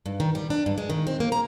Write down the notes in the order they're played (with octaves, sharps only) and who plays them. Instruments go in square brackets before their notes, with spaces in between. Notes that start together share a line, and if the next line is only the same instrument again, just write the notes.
[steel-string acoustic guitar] G2
D#3
G3
D4
G2
G#3
D#3
C4
A#3
A#5